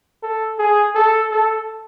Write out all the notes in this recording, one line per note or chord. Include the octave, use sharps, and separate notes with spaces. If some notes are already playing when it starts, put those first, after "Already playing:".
A4
G#4
A4
A4